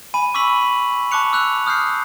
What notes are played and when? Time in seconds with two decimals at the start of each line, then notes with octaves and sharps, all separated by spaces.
0.14 G#5 B5 D#7
0.34 C#6 D6 E6 B6 F#7
1.11 A5 C#6 D6 F#6 C#7 F7
1.32 D6 E6 F#6 F7
1.66 D#6 F6 G6 C7